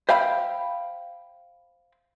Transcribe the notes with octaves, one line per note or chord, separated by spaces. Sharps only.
C5 E5 F5 G5 B5